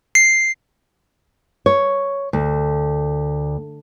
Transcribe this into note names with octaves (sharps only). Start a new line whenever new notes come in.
C7
C#5
D2